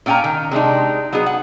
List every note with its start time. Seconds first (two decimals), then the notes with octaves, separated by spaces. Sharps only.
0.06 A#2 C#4 G5 G#5 A#5
0.24 D#3
0.51 C3 G#3 D4 D#4
1.12 F#3 B3 D#4 G#4
1.26 F#5